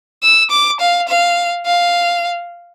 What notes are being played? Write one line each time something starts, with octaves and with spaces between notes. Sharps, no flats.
E6
D6
F5
F5
F5